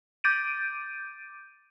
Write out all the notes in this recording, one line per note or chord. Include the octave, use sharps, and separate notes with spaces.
D6 G6 A6 D7 D#7